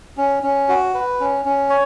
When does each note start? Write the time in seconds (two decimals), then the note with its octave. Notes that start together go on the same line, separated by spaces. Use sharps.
0.17 C#4
0.43 C#4
0.69 F#4
0.94 B4
1.20 C#4
1.45 C#4
1.70 C#5